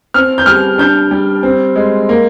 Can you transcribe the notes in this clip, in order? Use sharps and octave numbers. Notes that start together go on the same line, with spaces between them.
C4 F6
G6
G3 F6
D4 G6
G3
C4
G#3
A#3